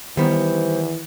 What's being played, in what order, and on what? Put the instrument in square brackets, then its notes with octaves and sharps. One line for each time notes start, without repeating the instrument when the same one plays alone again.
[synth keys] D#3 [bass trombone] E3 [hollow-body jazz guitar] G3 B3 [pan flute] C5